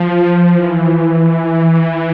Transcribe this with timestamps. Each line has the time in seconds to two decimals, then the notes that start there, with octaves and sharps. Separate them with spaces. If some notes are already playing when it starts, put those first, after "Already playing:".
Already playing: F3
0.10 F3
0.54 E3